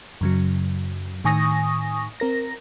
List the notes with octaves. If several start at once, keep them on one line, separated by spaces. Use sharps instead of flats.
F#2 C#3 F#3
A2 D#3 G#5 C#6 D#6 A#6
C4 A#4 A#6